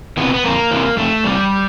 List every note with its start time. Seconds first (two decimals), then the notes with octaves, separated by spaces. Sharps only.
0.17 C3 E3 B3
0.34 B3
0.44 F2 A#3
0.71 C3 E3
0.97 F2 A3
1.24 C3 E3 G3